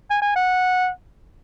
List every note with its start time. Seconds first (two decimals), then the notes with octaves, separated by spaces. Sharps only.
0.11 G#5
0.22 G#5
0.36 F#5